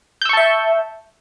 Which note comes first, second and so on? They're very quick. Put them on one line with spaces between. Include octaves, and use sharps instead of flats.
G6 E6 C#6 A5 E5